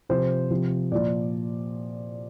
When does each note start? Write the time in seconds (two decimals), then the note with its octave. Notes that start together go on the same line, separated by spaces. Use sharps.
0.09 C3 F3 C5
0.51 C3 F3
0.92 A#2 F3 D5